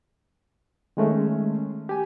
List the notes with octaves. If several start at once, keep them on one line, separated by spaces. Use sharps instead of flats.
D#3 G#3 A3 C#4
G4 G#5